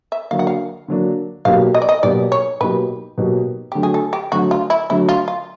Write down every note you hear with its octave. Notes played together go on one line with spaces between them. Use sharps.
E5
D3 F#3 A#3 D4 F5
F#5
F5
D3 F#3 A#3 D4
B2 F#3 A#3 D#4 G4 F5
D#5
D5
D#5
B2 F#3 A#3 D#4 G4 D5
C#5
B2 F#3 A#3 D#4 G4 B4
B2 F#3 A#3 D#4 G4
D3 F#3 A3 G4
G#4
A4
G4
D3 F#3 A3 F#4
F4
E4
D3 F#3 A3 E4
F4
F4